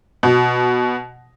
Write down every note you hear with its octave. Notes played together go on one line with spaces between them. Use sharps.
B2